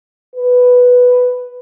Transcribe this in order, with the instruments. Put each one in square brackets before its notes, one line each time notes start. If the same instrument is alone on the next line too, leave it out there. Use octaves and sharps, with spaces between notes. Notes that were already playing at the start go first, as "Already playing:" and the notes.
[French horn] B4